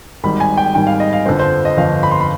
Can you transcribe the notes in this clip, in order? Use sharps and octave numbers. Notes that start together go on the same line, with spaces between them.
G#1 G#2 D#3 G3 B5
G#5
G5
G#1 G#2 D#3 G3 G5
F5
D#5
F5
G1 F2 D3 F3 C5
C5
D#5
G1 F2 D3 F3 F5
B5
C6
B5